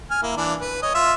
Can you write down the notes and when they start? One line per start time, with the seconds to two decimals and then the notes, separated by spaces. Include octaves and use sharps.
0.11 G#5 F6
0.23 A#3 E4
0.37 E3 D4
0.61 B4
0.83 C#5 D#5
0.95 F4 E5